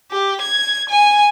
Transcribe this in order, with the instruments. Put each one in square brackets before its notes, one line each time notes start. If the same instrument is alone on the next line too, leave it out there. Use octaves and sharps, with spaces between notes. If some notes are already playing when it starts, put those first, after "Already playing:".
[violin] G4
G#6
G#5